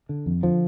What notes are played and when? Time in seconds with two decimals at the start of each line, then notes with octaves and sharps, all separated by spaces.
0.09 D3
0.26 F2
0.43 D3 F3